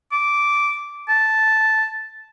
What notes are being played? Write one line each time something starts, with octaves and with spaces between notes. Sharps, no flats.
D6
A5